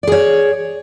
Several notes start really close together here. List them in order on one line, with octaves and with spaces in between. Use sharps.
D5 G#4 C#5